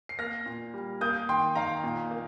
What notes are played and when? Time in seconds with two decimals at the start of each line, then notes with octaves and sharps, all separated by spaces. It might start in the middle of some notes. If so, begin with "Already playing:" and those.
0.09 C7
0.19 A#3 F6 A#6
0.46 A#2
0.74 G3
1.01 A#3 D#6 G6
1.29 D#3 G5 C6
1.56 D#3 F5 A#5
1.83 A#2
2.11 A#3